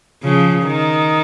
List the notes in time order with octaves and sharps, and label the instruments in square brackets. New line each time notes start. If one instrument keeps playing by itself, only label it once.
[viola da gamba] C#3 F3
D#3